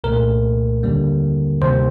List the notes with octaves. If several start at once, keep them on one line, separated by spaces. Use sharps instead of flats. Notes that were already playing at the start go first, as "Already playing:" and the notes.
C2 A#2 A3 A#4
D#2 D3 G3 A#3
D2 C3 D#3 G3 A#3 C5